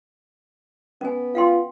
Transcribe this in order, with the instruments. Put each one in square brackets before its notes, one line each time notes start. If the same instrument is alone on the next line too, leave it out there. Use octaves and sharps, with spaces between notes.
[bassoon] B3 [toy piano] C#4 G#5
[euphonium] F4 [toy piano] F5 G5 C6